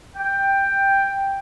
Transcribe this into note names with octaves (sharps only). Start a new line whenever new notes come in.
G5